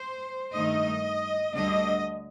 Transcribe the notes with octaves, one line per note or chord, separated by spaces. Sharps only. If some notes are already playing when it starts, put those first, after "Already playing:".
Already playing: C5
G2 D#3 A3 D#4 D#5
D2 D3 G3 D4 D#5